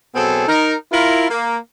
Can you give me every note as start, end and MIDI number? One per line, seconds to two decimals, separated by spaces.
0.14 0.46 47
0.14 0.46 54
0.14 0.46 59
0.14 0.46 60
0.14 0.46 68
0.14 0.46 69
0.48 0.74 63
0.48 0.74 70
0.92 1.26 64
0.92 1.26 65
0.92 1.26 70
1.29 1.57 58